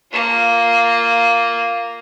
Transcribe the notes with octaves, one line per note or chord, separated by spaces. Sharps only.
A#3 F4